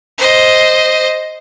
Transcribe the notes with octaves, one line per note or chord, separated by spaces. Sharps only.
C5 D#5